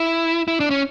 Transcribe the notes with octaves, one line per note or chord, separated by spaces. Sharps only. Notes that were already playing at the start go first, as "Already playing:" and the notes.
Already playing: E4
E4
D4
C#4